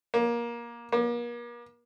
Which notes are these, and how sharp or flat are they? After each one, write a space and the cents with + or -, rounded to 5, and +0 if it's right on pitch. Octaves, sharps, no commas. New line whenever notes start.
A#3 +20
A#3 +40